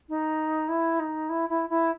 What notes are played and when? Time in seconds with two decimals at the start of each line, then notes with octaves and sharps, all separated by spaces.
0.09 D#4
0.69 E4
1.00 D#4
1.29 E4
1.49 E4
1.70 E4